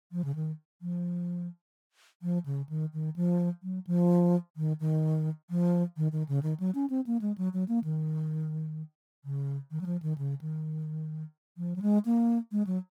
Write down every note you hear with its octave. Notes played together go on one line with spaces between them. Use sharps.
F3
C#3
D#3
F3
F3
C#3
D#3
D#3
F3
F#3
F3
D#3
D#3
F3
D#3
D#3
C#3
D#3
F#3
C#4
C4
A#3
G#3
F#3
F#3
A#3
D#3
C#3
D#3
F#3
F3
D#3
C#3
D#3
F3
F#3
G#3
A#3
G#3
F#3